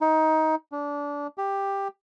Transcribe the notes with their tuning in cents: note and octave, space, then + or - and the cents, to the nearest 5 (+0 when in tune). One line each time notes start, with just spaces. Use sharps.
D#4 +20
D4 -25
G4 +10